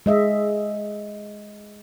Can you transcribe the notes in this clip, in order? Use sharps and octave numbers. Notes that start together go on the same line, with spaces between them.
G#3 D#5 E5